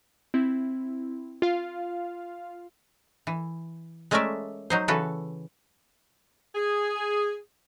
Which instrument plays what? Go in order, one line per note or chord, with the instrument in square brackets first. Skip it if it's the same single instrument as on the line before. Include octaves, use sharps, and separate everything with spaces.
[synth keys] C4 E4
F4 F5
[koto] E3
G#3 A3 C#4 A#4 D5 E5
F#3 D#4 C5
C#3 E3 F#4 A4 B4
[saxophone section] G#4